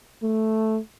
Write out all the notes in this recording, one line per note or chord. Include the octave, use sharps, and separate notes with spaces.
A3